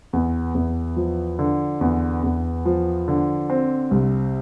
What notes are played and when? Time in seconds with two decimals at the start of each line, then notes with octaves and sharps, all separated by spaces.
0.13 E2
0.55 E2
0.96 F3
1.39 D3
1.81 E2
2.23 E2
2.65 F3
3.08 D3
3.50 C4
3.91 C2